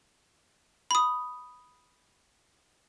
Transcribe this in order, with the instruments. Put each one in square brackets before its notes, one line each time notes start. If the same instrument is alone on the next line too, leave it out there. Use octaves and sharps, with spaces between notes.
[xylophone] B5 D#6